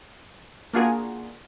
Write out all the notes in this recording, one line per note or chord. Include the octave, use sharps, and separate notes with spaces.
A#3 D4 F4 F#4 G#4 A#4